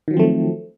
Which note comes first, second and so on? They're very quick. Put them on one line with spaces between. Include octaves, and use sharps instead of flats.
D#3 F#3 F3 C4 A3